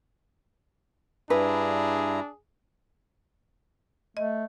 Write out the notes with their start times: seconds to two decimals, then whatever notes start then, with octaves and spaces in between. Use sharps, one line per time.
1.30 G2 D4 E4 G#4 B4 A#5
4.17 A3 D#5